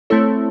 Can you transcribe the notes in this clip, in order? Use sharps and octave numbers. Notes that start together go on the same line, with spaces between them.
A3 C4 E4 A4 C#5